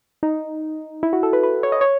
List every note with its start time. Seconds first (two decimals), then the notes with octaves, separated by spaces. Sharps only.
0.23 D#4
1.03 E4
1.13 F#4
1.23 A4
1.33 B4
1.43 B4
1.63 C#5
1.72 D#5
1.81 C#5